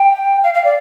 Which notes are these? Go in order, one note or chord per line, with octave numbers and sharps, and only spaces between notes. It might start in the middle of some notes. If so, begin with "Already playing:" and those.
Already playing: G5
F5
F5
D5